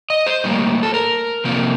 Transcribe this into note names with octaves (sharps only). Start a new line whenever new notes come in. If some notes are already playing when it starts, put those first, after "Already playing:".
D#5
C5
A2 G3 A#3
A4
A#4
F2 C3 F3 A#3